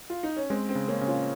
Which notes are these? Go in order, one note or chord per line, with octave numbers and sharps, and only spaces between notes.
F4
D#4
C#4
G#3 C4
C4
C#3
A#3 C#4
C#3
C#4 F4